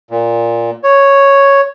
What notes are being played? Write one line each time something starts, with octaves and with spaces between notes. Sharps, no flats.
A#2
C#5